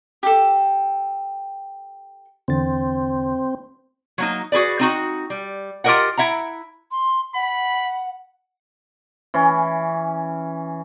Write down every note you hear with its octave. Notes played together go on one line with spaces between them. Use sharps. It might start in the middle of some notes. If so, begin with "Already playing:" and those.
G4 A4
E2 D3 C4 A6
F#3 A#3 D#4
F#4 G#4 B4 D5
C4 D#4 F#4
G3
F4 G4 A4 A#4 D#5 F#5
E4 E5 F#5 A#5
C6
F#5 B5
E3 C#4